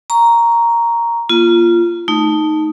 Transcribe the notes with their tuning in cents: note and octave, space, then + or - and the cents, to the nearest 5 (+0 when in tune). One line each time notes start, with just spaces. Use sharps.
A#5 +0 C#6 +15
A#3 +25 F4 -15
A3 +0 D#4 +0